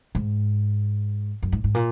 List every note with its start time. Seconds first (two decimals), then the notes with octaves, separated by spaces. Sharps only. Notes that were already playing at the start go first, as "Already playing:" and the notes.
0.15 G#2
1.42 F#2
1.52 G#2
1.64 G#2
1.74 A#2